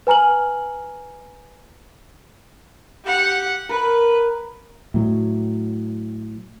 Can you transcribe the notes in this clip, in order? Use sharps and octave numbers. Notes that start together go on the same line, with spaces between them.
B4 G#5 A#5 F6 F#7
G4 F#5
A#4 B4
A2 F#3